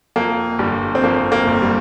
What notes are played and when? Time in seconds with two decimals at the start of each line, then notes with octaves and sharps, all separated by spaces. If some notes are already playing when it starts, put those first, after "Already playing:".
0.16 F2 A#3
0.59 G1 G3
0.95 C4
1.03 F2 A#3
1.32 A#3
1.47 G1
1.62 G3